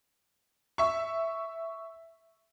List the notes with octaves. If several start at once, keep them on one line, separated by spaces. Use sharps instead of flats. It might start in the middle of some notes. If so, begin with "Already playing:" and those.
E5 C#6